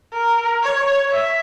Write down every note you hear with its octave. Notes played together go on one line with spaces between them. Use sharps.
A#4
C#5
E5